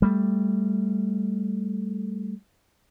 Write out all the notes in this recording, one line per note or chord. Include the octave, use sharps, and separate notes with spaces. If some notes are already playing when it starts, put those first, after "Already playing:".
G3 A3